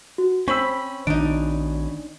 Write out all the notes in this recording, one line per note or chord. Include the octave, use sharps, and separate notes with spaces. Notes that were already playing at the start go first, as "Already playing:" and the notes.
F#4
C4 C#4 B5 C#6 E6
A#1 D#3 D4 D#4 D7